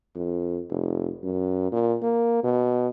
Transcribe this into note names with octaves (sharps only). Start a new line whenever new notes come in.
F2
F1
F#2
A#2
A#3
B2